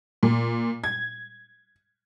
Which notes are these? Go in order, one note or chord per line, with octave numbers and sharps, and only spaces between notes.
A#2
G#6